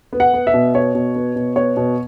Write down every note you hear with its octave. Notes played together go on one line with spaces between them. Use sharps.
B3
F#5
B3
E5
B2
B3 C#5
B2
B3
B2
B3 C#5
B2